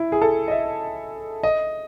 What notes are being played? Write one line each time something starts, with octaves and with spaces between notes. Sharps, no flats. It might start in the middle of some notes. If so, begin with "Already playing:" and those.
Already playing: E4
G#4
A4
D#5
E5
D#5